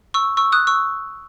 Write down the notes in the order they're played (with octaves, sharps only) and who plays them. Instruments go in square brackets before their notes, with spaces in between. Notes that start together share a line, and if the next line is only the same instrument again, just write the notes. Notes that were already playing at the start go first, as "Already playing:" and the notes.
[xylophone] C#6 E6
C#6 E6
D#6 F#6
C#6 E6